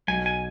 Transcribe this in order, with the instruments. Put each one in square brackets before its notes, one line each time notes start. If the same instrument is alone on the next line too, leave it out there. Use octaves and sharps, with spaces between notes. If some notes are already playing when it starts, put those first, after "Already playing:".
[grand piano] B1 [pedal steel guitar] G#5
[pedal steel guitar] G#5